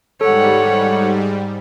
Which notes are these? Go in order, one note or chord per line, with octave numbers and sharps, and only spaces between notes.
G#2 G3 A4 C#5 F#5